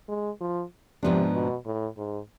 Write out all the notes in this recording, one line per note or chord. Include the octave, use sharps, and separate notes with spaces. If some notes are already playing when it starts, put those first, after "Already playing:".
G#3
F3
G#2 C3 F3 B3 D4
B2
A2
G#2